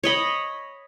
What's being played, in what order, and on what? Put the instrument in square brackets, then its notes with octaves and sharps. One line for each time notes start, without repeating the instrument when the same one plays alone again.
[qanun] C#5 D#5 B5